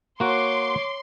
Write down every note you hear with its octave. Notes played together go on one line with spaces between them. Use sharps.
A#3 F#4 C#5 C6 D6